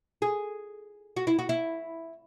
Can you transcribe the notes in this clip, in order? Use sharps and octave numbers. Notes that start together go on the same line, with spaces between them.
G#4
F#4
E4
F#4
E4